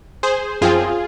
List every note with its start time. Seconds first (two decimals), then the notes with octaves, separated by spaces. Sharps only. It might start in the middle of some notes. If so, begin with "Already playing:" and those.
0.23 G#4 C5
0.62 F#2 F3 C4 F4 G#4